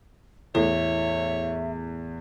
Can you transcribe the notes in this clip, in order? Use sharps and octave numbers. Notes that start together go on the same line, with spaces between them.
E2 A2 C#5 E5